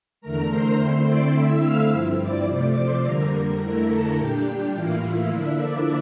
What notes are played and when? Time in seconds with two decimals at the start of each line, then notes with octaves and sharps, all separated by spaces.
0.21 E2 D3 A3 A#4 A#5
0.49 C5 C6
0.78 D3 A3 C4 E4
1.06 D5 D6
1.34 D3 A3 C4 E4 E5 E6
1.62 F5 F6
1.91 G2 F3 C4 E4
2.19 D5 D6
2.48 C3 F3 A3
2.75 C5 C6
3.03 F2 D3 G3 A#3 A#4 A#5
3.32 A#4 A#5
3.61 F2 D3 A3 E4
3.88 A4 A5
4.17 A#2 G3 D4 G4 G5
4.73 A2 E3 A#3 E4 F4 F5
5.02 E4 E5
5.30 D3 F3 A#3 D4
5.58 D4 D5